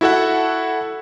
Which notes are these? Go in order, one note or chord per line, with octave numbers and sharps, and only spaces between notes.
E4 F#4 A4 E5 F#5